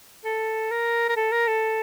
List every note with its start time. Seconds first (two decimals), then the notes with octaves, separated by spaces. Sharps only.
0.25 A4
0.71 A#4
1.09 A#4
1.16 A4
1.32 A#4
1.47 A4